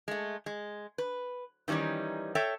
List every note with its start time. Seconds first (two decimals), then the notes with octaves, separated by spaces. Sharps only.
0.08 G#3 A3
0.46 G#3
0.98 B4
1.68 D#3 E3 G3 C#4 D#4
2.35 A4 C#5 E5 G5